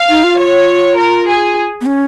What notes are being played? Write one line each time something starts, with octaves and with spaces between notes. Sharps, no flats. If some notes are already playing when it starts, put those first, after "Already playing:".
Already playing: F5
D#4
F4
C#5
A#4
G#4
B3
C#4